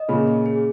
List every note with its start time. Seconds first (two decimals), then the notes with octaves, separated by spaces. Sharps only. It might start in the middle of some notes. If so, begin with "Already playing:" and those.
Already playing: D#5
0.08 A#2 C#3 G#4
0.28 G#4
0.46 G#4